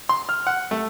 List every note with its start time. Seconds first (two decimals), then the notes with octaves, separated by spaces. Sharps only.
0.09 C6
0.29 F6
0.47 F#5
0.71 A3